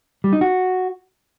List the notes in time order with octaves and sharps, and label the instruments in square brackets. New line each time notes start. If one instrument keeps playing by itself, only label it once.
[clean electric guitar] G3
D#4
F#4